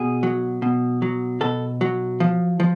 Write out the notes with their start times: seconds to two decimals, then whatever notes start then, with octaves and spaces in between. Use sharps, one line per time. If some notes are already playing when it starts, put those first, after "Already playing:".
Already playing: B2 G#4
0.23 F#3
0.62 B2
1.02 F#3
1.41 B2 A4
1.81 F#3
2.20 F3
2.60 F3